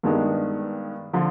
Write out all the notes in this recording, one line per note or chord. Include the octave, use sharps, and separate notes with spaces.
G2 D#3 G#3 B3 D4
D3 F3